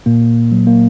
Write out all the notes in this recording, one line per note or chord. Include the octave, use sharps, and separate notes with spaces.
A#2 A#3
F#3
A#3